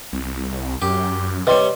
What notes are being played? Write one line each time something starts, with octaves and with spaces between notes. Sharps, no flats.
C2
F#2 G4
C3 G3 B4 C#5 D#5 C6